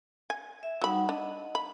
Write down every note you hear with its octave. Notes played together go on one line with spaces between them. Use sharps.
G#5
E5
F#3 G3 D#4 F#5 B5
D4 D#5
B5